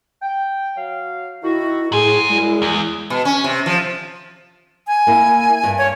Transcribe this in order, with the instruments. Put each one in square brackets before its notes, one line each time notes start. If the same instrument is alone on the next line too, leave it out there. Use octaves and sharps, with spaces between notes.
[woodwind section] G5
F#3 F5
[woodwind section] D#3 F#4 [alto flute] E4
[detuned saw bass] A2 [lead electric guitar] F#3 G#5 [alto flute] G#4 [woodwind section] C6
[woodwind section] F#2 G3 [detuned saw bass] G#3 [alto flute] E4
[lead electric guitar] E2
[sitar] B2
C#4
C3
F3
[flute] G#5
[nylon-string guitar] A#3 E4
G2
[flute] C#5